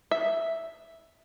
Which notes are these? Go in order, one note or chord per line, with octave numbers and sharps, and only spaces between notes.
E5